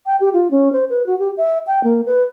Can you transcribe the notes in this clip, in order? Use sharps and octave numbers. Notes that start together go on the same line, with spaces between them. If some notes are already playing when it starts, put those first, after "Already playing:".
G5
G4
F4
C#4
C5
B4
F#4
G4
E5
G5
A#3
B4